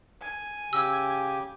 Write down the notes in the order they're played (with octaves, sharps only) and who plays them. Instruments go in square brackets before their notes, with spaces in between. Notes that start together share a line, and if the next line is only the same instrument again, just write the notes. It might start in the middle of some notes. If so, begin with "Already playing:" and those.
[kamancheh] G#5
[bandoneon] C#3 G4 [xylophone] E6